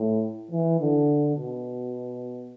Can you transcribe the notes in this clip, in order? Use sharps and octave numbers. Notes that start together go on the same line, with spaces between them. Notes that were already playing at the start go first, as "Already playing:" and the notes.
Already playing: A2
E3
D3
B2